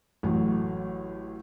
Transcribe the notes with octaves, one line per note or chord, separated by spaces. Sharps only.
A1 A2 F#3